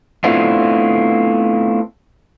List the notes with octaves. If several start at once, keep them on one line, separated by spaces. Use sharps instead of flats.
A3 B3 C4 D4 E4 F4